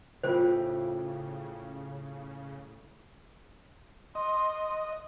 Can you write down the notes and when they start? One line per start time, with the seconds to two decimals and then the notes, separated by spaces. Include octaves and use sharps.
0.24 A2 C#3 F4 G4 C5 G5
4.15 D#5 C6